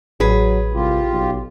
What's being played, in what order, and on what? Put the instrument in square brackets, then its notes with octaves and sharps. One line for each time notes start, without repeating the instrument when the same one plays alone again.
[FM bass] A1 [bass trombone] F#3 [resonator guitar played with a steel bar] G#4 B4
[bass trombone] C2 [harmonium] F4 G4
[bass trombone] B1